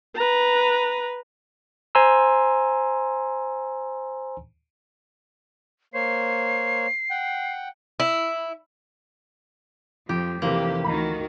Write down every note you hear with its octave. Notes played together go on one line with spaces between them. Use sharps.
B4 A#5
C5 G#5 A#5 C6 E6
A#3 C5 C#5 C7
F#5 G5
E4
F2 F3 G4
F1 C3 E3 F3 A#3 G4
D2 D#3 F#4 A#5 B5